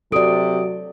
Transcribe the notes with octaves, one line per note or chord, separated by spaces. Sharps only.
C3 F#3 F#4 A4 D5 D#6 D7